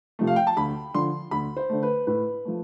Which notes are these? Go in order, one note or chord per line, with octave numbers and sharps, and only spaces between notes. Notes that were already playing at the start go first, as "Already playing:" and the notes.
C3 F3 A3
F5
G5
A5
D2 B5
D3 F3 C6
D2 B5
C5
D3 A3
B4
A2 B4
F3 A3